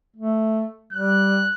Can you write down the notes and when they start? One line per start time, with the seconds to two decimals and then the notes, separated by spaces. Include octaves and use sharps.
0.16 A3
0.93 G3 F#6